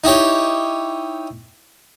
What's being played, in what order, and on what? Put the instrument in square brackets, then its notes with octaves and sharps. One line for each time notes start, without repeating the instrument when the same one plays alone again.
[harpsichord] D#4 E4 G4 C#5